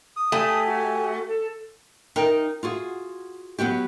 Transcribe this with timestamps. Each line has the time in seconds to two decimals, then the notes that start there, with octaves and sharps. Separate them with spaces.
0.16 D#6
0.32 A3 G4 G#5 D#6
0.66 F#4
1.28 A4
2.16 D#4 A#4 G5
2.63 F4 F#4 G#4
3.59 F#3 B3 F#4 G4